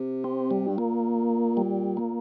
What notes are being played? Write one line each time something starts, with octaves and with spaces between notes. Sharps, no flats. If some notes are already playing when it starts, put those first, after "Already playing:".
Already playing: C3
C4
G3
G2
A#2 A#3
G3
A#3